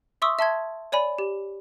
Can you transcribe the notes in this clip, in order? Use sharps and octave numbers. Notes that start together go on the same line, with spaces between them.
E5 C6 C#6 D#6 E6
E5 A5 C6 G#6
C#5 D5 G#5 B5
G4